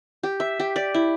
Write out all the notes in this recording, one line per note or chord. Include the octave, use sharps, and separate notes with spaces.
G4
E5
G4
D5
E4